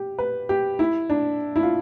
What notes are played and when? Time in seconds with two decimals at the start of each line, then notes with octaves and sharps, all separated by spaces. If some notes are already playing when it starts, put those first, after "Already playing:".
Already playing: G4
0.18 B4
0.49 G4
0.79 E4
1.10 D4
1.56 E4
1.63 F4